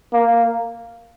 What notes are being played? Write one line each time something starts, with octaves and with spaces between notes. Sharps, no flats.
A#3